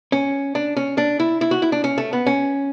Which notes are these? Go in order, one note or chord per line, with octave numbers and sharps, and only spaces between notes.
C#4
D4
C#4
D4
E4
E4
F#4
E4
D4
C#4
A3
B3
C#4